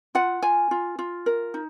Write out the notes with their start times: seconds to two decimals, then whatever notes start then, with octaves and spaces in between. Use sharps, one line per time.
0.15 F4 F#5
0.42 F4 G#5
0.71 F4
0.99 F4
1.26 A#4
1.54 D#4